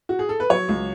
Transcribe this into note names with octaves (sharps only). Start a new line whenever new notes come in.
F#4
G#4
A4
B4
F#3 C#5
C#2